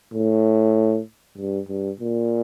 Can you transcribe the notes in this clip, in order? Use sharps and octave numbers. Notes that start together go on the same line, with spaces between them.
A2
G2
G2
A#2